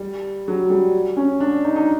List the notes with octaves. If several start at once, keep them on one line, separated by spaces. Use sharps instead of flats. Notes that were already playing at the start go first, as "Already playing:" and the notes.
Already playing: G3
F#3
G3
C#4
D4
D#4
D#4